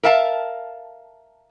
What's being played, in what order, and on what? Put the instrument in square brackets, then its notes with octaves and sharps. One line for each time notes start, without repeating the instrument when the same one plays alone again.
[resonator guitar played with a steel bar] A#4 E5 F5 A5